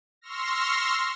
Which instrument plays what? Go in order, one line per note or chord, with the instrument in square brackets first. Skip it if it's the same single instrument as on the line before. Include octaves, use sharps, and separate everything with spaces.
[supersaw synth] C6 C#6 E6 F6 A#6